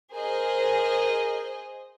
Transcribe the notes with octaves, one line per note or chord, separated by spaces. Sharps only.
G#4 A#4 C5 D#5